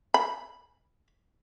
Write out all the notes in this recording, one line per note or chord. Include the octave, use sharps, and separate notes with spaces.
B5